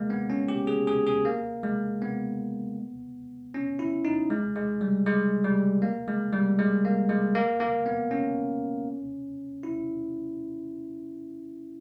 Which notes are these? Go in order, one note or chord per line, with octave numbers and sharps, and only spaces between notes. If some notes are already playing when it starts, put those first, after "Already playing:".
Already playing: G#3 A#3
B3
C#4
G4
G#4
G#4
G#4
A#3
G#3
B3
C#4
E4
D#4
G#3
G#3
G3
G#3
G3
A#3
G#3
G3
G#3
A#3
G#3
A#3
A#3
B3
C#4
E4